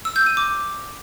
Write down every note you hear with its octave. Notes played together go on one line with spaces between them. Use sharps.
E6
G6
D#7
D6